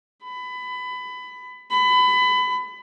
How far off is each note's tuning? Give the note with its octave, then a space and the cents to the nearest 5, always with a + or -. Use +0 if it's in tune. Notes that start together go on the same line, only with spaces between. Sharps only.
B5 +20
B5 +25